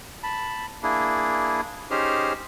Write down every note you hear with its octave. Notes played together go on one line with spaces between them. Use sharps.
A5 B5
A#3 D4 E4 G#4
C#4 D#4 G4 G#4 C5 F6